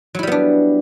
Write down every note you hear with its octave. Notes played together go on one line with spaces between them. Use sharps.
F#3 G3 B3 D4 E4